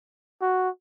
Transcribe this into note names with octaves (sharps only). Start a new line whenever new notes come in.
F#4